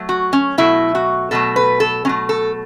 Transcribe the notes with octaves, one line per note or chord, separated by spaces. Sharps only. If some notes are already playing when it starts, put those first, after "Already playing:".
Already playing: F#3 A3
F#4
C#4
B2 F#3 A3 E4
F#4
B2 F#3 A3 A4
B4
A4
B2 F#3 A3 C#4
A4